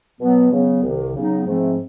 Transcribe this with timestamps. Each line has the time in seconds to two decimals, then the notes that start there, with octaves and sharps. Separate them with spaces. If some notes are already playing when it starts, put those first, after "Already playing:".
0.20 B2 F#3 B3
0.51 C#3 F#3 B3
0.82 C2 C3 D#3
1.15 C#3 F#3 B3 D#4
1.46 G#2 F3 A3 C4